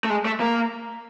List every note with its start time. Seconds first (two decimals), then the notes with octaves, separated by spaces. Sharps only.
0.04 A3
0.10 G#3
0.25 A3
0.40 A#3